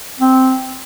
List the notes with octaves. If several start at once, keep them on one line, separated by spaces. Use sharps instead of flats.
C4